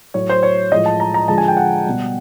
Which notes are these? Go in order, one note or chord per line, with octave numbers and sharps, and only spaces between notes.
A2 F#3 C#5
C5
C#5
A2 F3 G#3 D#5
A5
A#5
A#5
D3 F3 G#3 A5
G#5
G5
F#5
B2 G3